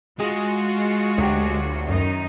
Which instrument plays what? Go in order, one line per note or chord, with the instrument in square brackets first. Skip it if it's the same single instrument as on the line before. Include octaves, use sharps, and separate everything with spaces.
[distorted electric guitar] G#3 [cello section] F4 F#4 [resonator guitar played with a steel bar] G#4
[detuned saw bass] D2 [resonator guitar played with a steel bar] F#3 G4
[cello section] F#2 D#3 D#4